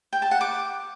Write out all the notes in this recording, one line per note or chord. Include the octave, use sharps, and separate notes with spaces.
G5
A5
F#5
D6